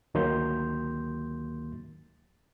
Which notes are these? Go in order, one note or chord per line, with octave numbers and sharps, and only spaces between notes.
D2 D#3 F#3 A#3 C6 G6